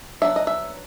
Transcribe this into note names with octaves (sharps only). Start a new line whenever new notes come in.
F#3 B3 D4 E5
D#5
E5